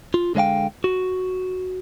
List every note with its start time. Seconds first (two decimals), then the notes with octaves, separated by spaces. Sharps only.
0.14 F4
0.35 D3 G#3 C#5 F5 G5
0.84 F#4